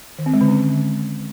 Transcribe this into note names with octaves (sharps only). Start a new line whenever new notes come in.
D#3
C4
G#3
D3
C#4